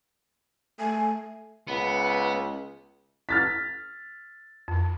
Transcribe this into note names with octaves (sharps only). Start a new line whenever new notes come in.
A3 G#5
C#2 B3
F6 A6 B6
F2